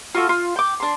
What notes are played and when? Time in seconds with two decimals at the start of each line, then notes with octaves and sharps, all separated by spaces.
0.15 F4 F#4 A4
0.29 F4
0.56 G5 D6
0.80 D4 C6